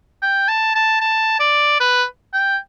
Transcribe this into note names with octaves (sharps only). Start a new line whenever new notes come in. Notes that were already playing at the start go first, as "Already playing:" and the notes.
G5
A5
A5
A5
D5
B4
G5